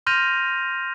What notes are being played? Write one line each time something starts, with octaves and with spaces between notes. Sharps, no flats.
C6 F6 G6 A#6 D#7 F7